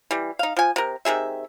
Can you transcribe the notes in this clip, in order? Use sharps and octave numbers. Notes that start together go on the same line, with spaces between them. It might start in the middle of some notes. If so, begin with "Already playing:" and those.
E3 G3
D#4 F5
F3 G#5
C3 A#4
C3 D#3 G#4 E5